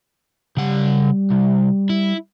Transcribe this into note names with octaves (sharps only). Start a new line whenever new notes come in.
C#3 G3 F#5
C2
E4